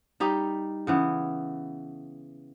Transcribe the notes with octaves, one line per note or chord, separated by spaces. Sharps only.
G3 D#4 G4
C#3 E3 B3